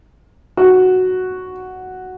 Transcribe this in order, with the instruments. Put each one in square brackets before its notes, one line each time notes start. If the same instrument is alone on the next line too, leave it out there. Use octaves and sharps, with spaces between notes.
[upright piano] F#4